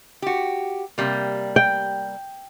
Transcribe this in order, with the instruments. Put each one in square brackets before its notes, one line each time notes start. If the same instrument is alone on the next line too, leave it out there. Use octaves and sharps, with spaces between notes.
[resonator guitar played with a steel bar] F#4 G4
C3 G3 A#3
[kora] G5